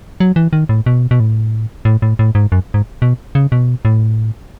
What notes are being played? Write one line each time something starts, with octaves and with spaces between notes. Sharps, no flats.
F#3
E3
D#3
A2
B2
B2
A2
A2
A2
A2
G#2
F#2
G#2
B2
C#3
B2
A2